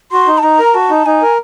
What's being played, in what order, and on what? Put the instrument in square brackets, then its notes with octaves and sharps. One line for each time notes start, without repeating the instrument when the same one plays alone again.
[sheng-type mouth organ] F#4 [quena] C6
[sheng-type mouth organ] D#4
[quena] A5
[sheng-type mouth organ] D#4 [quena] A#5
[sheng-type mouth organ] A#4
[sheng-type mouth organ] F#4 [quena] A5
[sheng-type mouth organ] D#4
[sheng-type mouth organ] D#4 [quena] G#5
[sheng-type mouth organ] A#4